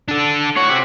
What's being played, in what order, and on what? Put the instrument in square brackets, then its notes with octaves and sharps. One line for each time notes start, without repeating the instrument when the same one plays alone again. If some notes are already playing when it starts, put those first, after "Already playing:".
[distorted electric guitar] D4 A4
[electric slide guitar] A2 C#5 [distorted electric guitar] F#4
[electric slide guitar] C3 C4 G4